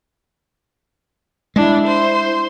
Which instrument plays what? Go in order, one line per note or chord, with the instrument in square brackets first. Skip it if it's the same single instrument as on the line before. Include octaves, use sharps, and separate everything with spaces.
[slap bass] G#3 [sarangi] D4 [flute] E4
[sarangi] C5